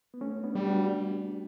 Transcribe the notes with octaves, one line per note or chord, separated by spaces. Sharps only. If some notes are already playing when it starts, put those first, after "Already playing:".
B3
A3 C#4
B3 D4
G3
D4 F#4